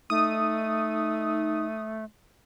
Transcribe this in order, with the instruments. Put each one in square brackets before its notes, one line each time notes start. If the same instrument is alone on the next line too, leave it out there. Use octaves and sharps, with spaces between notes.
[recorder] A3 [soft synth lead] D#4 [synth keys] D#6